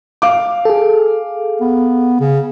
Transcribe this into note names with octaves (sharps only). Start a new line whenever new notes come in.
F5 D6
G#4 A4
B3
C#3